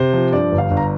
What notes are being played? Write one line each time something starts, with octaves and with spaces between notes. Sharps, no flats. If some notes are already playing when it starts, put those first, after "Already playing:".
Already playing: C3 C5
F3
G2 D5
G1
F5
G1
A#5